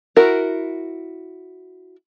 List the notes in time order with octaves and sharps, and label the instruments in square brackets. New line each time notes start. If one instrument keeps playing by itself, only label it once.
[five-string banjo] E4 F#4 A#4